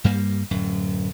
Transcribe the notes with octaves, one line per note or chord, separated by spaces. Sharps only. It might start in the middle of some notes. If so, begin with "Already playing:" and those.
G2 G3 A#3
D1 F#2